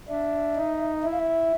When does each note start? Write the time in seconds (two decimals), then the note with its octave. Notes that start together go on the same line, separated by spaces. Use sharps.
0.08 D4 E5
0.56 D#4
1.03 E4 E5
1.11 F5
1.19 E5